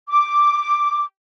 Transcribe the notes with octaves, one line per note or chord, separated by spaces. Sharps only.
D6